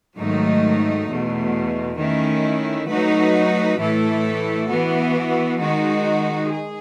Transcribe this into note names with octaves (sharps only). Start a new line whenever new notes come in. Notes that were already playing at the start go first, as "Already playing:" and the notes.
G#2 D#3 F#3 A3 D#4
E2 B2 A3
D#3 A3 C#4 E4
F#3 A3 D#4 F#4 B4
A2 E3 A3 E4 A4
E3 B3 F#4
D#3 G#3 D#4 F#4
G#4